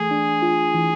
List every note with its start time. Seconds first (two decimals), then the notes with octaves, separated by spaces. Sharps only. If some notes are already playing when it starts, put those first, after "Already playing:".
Already playing: E3 A3 G#4
0.11 D4
0.42 F4
0.74 E3